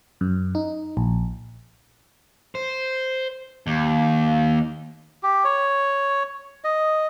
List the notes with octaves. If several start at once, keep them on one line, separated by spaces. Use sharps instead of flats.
F#2
D#4
A#1
C5
D#2
G4
C#5
D#5